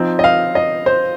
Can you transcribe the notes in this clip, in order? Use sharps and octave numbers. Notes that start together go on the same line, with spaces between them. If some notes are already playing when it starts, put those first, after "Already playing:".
Already playing: F3 C4 D#4
D#5
F5
D#5
C5